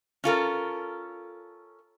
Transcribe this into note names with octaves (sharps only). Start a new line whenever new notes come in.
C#4 F4 A4 A#4